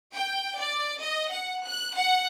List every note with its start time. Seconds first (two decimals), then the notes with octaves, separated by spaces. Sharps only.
0.15 G5
0.58 D5
1.01 D#5
1.31 F#5
1.65 F#6
1.95 F#5